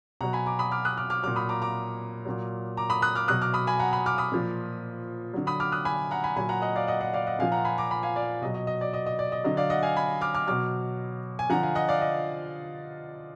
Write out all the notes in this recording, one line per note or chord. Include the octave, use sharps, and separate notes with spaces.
B2 F#3 F#5 A#5
G#5 B5
A#5 D6
B5 D#6
D6 F6
D#6 F#6
D6 F6
D6 F6
A#2 F#3 D6 F6
B5 D#6
A#5 D6
A#5 D6
A#2 F#3
A#5 D6
B5 D#6
D#6 F#6
D6 F6
B2 F#3 D#6 F#6
D6 F6
B5 D#6
G#5 B5
F#5 A#5
G#5 B5
D6 F6
B5 D#6
A#2 F3
D3 F#3
B5 D#6
D6 F6
D#6 F#6
G#5 B5
F#5 A#5
G#5 B5
A#2 F#3 G#5 B5
F#5 A#5
D#5 F#5
D5 F5
D#5 F#5
D#5 F#5
D5 F5
D#5 F#5
A#2 F3 F5 G#5
F#5 A#5
G#5 B5
A#5 D6
G#5 B5
F5 G#5
D5 F5
B2 F#3 D#5
D#5
D#5
D5
D#5
D#5
D5
D#5
D3 F#3 D#5
D5 F5
D#5 F#5
F5 G#5
G#5 B5
D6 F6
D6 F6
B2 F#3 D6 F6
G#5
D3 F3 F#5 A#5
F5 G#5
D#5 F#5
D5 F5
D#5